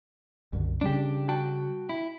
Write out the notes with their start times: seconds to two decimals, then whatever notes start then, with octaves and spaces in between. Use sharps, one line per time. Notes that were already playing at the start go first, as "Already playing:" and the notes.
0.53 C2 F#2 D3
0.81 C#3 G3 C#4 D4 G4
1.29 F#4 G5 A5
1.89 E4